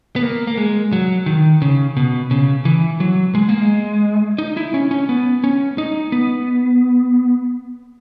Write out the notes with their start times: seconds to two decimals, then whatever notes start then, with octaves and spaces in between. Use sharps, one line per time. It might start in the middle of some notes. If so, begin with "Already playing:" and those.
0.16 B3
0.23 A#3
0.47 A#3
0.57 G#3
0.93 F#3
1.26 D#3
1.62 C#3
1.97 B2
2.31 C#3
2.65 E3
3.00 F#3
3.35 G#3
3.49 A#3
3.61 G#3
4.38 D#4
4.57 E4
4.74 C#4
4.91 C#4
5.09 B3
5.44 C#4
5.78 D#4
6.12 B3